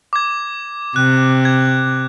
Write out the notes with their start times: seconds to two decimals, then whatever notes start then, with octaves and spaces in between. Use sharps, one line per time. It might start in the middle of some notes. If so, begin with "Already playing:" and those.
0.13 D6 G#6
0.96 C3 F#6
1.45 G#6